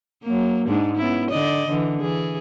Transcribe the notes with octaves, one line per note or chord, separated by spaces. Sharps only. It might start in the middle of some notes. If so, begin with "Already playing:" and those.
F#3 A#3
G#2 G#3 D4
B3 C#4 E4
D3 D5 D#5
D3 E3
E3 G#4